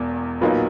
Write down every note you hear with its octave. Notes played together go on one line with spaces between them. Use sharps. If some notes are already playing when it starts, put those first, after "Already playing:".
Already playing: E1 E2
B1 A#2 F#3 A#3 D#4 B4